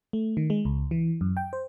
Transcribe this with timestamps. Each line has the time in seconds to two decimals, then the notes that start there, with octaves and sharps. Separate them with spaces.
0.13 A3
0.37 D#3
0.50 G#3
0.65 C#2
0.91 E3
1.21 F#2
1.37 G5
1.53 C5